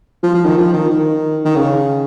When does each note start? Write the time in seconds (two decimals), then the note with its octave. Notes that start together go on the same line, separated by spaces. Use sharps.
0.23 F3
0.35 F3
0.46 D#3
0.58 F3
0.73 D#3
0.90 D#3
1.45 D#3
1.56 C#3